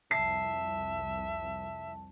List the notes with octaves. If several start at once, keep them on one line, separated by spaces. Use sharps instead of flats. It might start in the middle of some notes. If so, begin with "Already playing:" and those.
C2 F2 E5 A5 C7